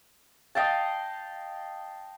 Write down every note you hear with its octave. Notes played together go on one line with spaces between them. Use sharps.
D#5 F5 G5 A5